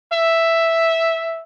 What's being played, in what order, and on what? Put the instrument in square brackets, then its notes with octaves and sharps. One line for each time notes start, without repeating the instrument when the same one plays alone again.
[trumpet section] E5